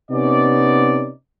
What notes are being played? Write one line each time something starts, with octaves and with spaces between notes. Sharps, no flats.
C3 B3 C#4 D#4 D5